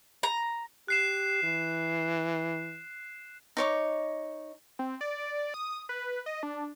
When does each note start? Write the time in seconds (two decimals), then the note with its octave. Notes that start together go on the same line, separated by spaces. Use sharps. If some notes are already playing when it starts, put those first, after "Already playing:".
0.23 A#5
0.88 G4 F#6 C7 E7
1.43 E3
3.57 D#4 C#5 D6
4.79 C4
5.01 D5
5.54 D#6
5.89 B4
6.26 D#5
6.43 D4